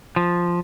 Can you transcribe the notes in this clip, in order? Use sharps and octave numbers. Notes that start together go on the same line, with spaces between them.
F3